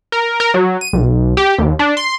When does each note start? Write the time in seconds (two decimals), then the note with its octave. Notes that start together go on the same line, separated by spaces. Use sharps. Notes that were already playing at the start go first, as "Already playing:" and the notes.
0.12 A#4
0.40 A#4
0.54 F#3
0.81 D#7
0.93 B1
1.37 G4
1.58 D#2
1.79 D4
1.97 C6